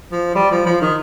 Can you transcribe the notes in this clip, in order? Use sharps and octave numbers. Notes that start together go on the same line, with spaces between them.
F3
G3
F3
F3
D#3